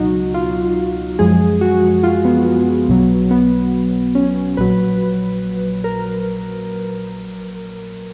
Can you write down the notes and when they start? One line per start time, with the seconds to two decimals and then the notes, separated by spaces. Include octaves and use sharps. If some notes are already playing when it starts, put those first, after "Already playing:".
Already playing: C#2 B2 F#3 D#4 F#4
0.34 F4
1.19 F#2 F3 G#3 G#4
1.61 F#4
2.03 F4
2.25 B3
2.88 B1 B2 F#3
3.31 B3
4.15 C#4
4.57 A#1 A#2 F#3 B4
5.84 A#4